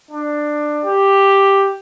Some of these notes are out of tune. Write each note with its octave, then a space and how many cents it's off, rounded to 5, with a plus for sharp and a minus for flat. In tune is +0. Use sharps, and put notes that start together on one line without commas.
D4 +15
G4 +5